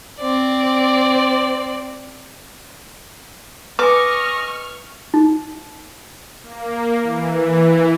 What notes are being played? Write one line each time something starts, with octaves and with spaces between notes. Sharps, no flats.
C4 D5
B4 D#5 G#5 C#6 D6 F6
D#4
A#3
E3